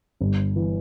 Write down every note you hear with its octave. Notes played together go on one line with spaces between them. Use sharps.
G1
E3